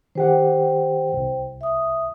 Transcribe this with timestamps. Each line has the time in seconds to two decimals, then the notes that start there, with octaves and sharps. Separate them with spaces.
0.15 D#3 G4 C5 F#5 G5
1.14 C2
1.61 E5 D#6